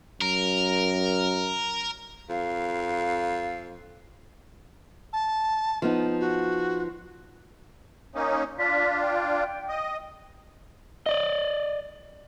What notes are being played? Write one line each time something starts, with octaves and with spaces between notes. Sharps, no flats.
F#2 A#4
F2 F5
A5
F3 B3 D#4
F#4
A#3 C#4 D#4
D4 F4 B6
G5
D#5
D5 D#5